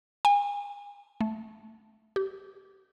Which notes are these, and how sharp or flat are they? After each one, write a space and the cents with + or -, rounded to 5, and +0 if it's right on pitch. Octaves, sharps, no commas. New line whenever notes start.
G#5 -35
A3 -5
G4 -25